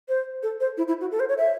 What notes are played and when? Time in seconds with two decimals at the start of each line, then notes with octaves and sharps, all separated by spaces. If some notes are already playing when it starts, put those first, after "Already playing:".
0.09 C5
0.43 A4
0.60 C5
0.77 E4
0.88 E4
1.01 F#4
1.11 A4
1.20 C5
1.29 C#5
1.38 E5